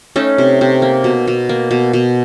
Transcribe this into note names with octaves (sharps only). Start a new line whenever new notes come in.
A3 C#4 D#4
C3
C3
A#3
B2
B2
A#3
B2
B2